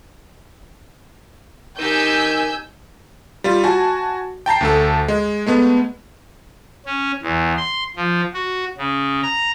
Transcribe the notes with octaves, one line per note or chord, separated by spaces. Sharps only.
D#3 D#4 G4 G#5 E6 G6
G3 F4
F#4 G#5 A5
G5 A5 A#5 C7
D2 A3 A4
G#3
G#3 A3 B3
C#4
E2
C6
F3
F#4
C#3
A#5